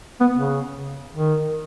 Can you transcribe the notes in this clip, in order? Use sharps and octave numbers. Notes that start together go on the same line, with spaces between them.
B3
C#3
D#3